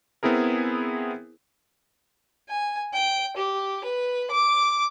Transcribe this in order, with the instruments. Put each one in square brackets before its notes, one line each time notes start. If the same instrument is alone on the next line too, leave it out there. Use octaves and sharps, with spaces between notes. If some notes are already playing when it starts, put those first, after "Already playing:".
[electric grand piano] B3 C4 E4 G#4 A#4
[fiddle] G#5
G5
G4
B4
D6